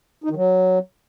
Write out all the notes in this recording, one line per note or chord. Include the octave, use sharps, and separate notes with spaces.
D#4
D#3
F#3